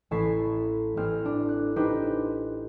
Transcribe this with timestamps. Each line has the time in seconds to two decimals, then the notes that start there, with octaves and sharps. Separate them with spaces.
0.11 A1 E4 A5 C#6 B6 C7
0.97 A1 C4 F6
1.25 D4
1.49 F#6
1.76 D4 D#4 G4 B4 C5